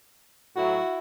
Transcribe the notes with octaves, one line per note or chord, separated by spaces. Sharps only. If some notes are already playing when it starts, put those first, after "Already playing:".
A2 F#3 E4 F#4